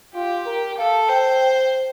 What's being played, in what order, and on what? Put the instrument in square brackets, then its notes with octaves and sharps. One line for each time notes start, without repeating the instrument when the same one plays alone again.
[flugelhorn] F4 [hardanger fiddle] G4
[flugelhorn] A#4
[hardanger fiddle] A4 [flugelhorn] F5
[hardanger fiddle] C5 [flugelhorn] G5
[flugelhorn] G5